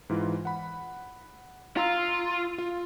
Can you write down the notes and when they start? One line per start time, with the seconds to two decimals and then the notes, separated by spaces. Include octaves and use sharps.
0.09 G#2 E3 F4
0.45 F#5 B5
1.77 F4 A#5 C6 E6
2.58 F4